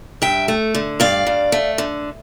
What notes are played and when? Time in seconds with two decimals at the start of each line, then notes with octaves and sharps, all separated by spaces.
0.22 G2 E5 G5
0.48 A3
0.75 D3
1.00 G2 D5 F5
1.27 G2
1.52 A3
1.78 D3